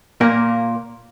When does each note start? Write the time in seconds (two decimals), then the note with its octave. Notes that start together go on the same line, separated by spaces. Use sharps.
0.21 A#2 A#3 A#4